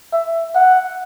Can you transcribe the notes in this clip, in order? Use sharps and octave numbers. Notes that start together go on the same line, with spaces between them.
E5
F#5